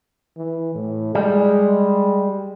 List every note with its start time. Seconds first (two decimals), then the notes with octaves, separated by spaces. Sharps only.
0.37 E3
0.75 A2
1.15 G3 G#3